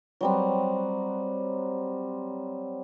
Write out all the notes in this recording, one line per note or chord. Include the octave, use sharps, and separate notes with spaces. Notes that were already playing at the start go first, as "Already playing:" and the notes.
F#3 G3 C4